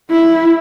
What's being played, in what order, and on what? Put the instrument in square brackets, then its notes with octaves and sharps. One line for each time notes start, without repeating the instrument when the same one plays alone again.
[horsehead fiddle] E4